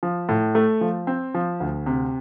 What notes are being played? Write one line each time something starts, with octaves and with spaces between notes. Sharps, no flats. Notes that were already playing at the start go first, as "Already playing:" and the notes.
F3
A2
A3
F3
C4
F3
D2
C3